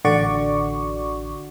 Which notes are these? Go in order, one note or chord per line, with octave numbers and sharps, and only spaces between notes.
A1 D3 F#4 D5 C#6